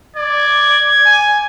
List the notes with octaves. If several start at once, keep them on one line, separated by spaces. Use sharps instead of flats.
D5 G#6
G#5